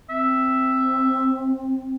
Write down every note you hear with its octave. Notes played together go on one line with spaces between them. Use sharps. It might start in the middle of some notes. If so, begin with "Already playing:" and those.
C4 E5